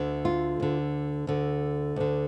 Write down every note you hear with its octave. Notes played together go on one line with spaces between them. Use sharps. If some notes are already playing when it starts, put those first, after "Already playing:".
Already playing: D2 D3
F4
D2 D3
D2 D3
D2 D3